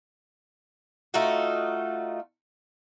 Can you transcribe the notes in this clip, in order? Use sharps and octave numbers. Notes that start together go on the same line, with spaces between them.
A3 D#4 F4 F#4